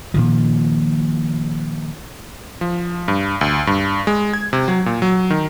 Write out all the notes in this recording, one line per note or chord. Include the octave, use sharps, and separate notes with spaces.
A#2 D#3 F3
F3
G2
D2
G2
G#3
G#6
C3
F#3
A#2
F#3
D#3